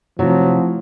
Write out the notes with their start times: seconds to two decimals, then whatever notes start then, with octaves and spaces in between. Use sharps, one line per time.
0.19 C3 F3 F#3 A3 E4 F4